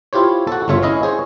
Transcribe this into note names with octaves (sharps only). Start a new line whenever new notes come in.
E4 F4 G4 C5 C#5
F#4 A4
G1 C#3 A3 F4 C#5 E5
C#4 E4 D#5 F5
G#4 C5 C#5